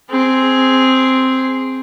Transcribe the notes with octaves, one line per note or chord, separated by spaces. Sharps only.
C4 G#4